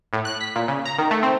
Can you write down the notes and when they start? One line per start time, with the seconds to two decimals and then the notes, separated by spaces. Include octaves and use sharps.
0.13 A2
0.25 F#6
0.41 B6
0.56 A#2
0.68 C#3
0.85 A#5
0.98 D#3
1.11 A3
1.23 C4